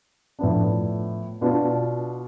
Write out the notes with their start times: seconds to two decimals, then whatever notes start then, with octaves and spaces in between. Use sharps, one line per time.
0.39 A2 F3 B3 D4
1.41 B2 B3 D4 F4